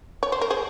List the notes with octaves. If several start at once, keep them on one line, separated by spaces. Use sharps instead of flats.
C#5
C5
A#4
G#4 C5